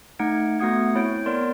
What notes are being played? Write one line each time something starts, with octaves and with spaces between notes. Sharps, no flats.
A3 D#4 F#5 G#6 D7
A3 B3 F#4 F#5 D#6 G#6
C4 E4 C#5 G6 D7
B3 A#4 C#5 D5 C6